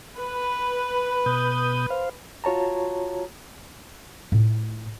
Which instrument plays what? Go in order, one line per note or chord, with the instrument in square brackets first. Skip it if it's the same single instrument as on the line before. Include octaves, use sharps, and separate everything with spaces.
[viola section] B4
[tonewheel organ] B2 D#6 G6
C5 F5
[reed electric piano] F4 F#4 C#5 A5 A#5
[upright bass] A2 F4